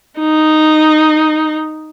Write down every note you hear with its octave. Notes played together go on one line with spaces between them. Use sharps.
D#4